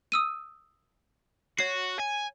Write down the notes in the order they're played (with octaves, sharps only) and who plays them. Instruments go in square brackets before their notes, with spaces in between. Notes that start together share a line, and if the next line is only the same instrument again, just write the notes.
[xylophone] D#6 E6 D#7
[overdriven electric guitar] F#4 [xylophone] C#5 C7
[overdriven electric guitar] G#5